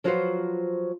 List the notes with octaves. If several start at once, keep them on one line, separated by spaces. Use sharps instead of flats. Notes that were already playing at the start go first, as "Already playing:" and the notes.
F3 F#3 F4 F#4 B4 C5